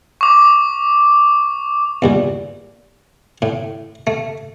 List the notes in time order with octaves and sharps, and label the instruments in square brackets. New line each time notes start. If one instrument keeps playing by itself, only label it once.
[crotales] C#6 D6
[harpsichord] E2 G2 A#2
A2
A3